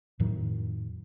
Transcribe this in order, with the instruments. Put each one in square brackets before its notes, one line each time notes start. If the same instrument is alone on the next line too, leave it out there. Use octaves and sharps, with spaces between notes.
[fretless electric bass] F2 A2 D#3 F#3